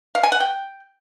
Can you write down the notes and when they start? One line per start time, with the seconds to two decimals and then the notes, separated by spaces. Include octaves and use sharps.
0.15 F5
0.23 G#5
0.32 F#5
0.40 G5